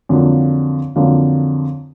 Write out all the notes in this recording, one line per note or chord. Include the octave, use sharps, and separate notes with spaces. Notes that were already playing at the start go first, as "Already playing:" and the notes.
F2 D3 F#3 A#3
F2 D3 F#3 A#3